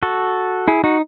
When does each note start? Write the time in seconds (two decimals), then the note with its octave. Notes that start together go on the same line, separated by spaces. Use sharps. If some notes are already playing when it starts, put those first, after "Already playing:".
0.03 F#4 A4
0.68 E4 G#4
0.84 D#4 F#4